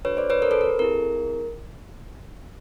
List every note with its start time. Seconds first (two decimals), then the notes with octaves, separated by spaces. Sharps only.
0.05 D4 F#4 A4 B4 C#5
0.17 C5 D5
0.30 B4 C#5
0.42 A#4 C5
0.51 A4 B4
0.61 A#4
0.70 A4
0.79 C4 E4 G#4 A#4